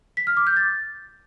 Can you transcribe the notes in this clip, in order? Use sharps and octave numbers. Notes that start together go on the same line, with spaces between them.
B6
F6
D6
G6
A6